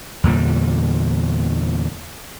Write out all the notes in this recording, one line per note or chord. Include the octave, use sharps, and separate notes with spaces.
E2 A#2 D3 G3